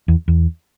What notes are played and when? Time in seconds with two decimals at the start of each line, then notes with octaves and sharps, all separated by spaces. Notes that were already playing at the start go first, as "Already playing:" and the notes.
0.08 E2
0.28 E2